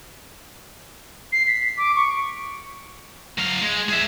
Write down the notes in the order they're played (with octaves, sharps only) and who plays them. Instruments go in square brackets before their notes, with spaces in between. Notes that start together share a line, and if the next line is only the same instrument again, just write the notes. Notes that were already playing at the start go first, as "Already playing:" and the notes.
[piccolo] C7
B6
D6
C#6
[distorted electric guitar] F#3 F5
G#3
G#4 E5